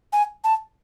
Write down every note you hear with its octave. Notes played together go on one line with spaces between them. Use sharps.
G#5
A5